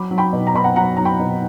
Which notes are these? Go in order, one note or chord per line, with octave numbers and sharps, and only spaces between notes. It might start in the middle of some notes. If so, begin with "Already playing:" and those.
Already playing: F#3 B5 D6
F#3
G5 B5
B2
A#5
B2 B5
F#5 A#5
F#3 F#5 A#5
F#3 A#5
G5 B5
B2